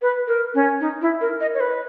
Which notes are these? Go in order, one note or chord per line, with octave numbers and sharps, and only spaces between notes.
B4
A#4
C#4
D#4
E4
A#4
D#5
C#5
B4